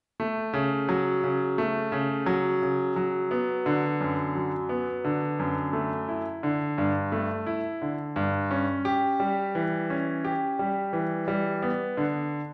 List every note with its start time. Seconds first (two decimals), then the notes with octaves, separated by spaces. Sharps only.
0.20 A3
0.53 C#3
0.89 F#3
1.24 C#3
1.58 A3
1.92 C#3
2.26 F#3
2.62 C#3
2.96 F#3
3.31 B3
3.66 D3
4.01 F#2
4.35 F#3
4.69 B3
5.04 D3
5.39 F#2
5.73 A3
6.08 E4
6.43 D3
6.78 G2
7.12 A3
7.46 E4
7.82 D3
8.16 G2
8.51 C#4
8.85 G4
9.20 G3
9.55 E3
9.90 C#4
10.25 G4
10.59 G3
10.93 E3
11.28 G3
11.62 B3
11.97 D3